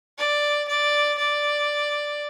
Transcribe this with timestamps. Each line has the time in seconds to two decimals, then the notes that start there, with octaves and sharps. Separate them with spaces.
0.19 D5
0.68 D5
1.18 D5